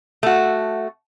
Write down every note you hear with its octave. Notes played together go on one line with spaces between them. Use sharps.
A3 F#4